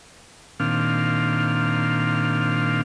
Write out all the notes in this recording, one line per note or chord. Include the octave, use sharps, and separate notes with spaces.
A#2 D#3 C4 D4 F5 F6